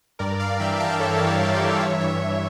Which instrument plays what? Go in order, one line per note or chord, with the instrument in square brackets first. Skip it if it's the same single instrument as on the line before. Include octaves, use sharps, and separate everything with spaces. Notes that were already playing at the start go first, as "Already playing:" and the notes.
[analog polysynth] G2 A#4 D5
D5 F5
E3 E5 G5
F5 A5
E3 A4 C#5
G4 A#4
G2
F4 A4
E3 C#5 E5
C#5 E5
E3